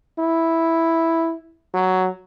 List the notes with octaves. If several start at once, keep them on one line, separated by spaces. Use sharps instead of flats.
E4
F#3